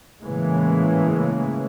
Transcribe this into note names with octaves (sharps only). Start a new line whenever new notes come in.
A2 C#3 E3 G#3 A#3